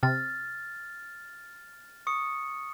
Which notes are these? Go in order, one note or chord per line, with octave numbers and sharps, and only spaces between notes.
C3 F6 A6
C#6 D#6 C#7